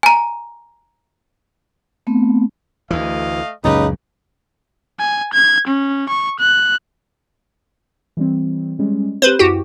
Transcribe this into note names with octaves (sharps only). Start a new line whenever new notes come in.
G#5 A#5
A3 B3 C4
D2 E3 A3 D#5 F5
C#2 F#2 A#2 C#3 D#4 G4 B4
G#5
G#6
C#4
C#6
F#6
E3 G3 C4
G3 G#3 C#4
C4 G4 B4 C5
F#2 E4 F#4 G4 G5